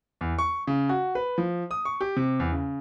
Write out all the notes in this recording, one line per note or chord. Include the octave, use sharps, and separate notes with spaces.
E2
C#6
C#3
F#4
B4
F3
D#6
C#6
G4
C3
E2
C#3